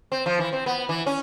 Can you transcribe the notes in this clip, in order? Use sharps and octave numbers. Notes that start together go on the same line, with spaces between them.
C4
F3
E3
C4
B3
E3
C#4